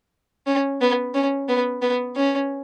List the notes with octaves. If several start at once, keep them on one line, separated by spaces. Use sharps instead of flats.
C#4
B3
C#4
B3
B3
C#4